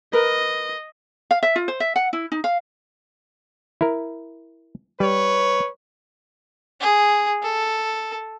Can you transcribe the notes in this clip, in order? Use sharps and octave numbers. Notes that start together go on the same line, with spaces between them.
A#4 B4 D#5
F5
E5
F4
C5
E5
F#5
E4
D#4
F5
E4 A#4
G3 B4 C#5
G#4
A4